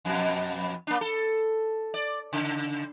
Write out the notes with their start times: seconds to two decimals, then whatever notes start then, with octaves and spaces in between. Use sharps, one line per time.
0.05 F2 B2
0.87 A#3 D4
1.01 A4
1.94 D5
2.33 C#3